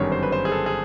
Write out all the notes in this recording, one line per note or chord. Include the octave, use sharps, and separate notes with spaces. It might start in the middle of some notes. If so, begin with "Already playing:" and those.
Already playing: G1 F#2 D#3 G3 C#5
C5
B4
C5
G#4
A4
G#4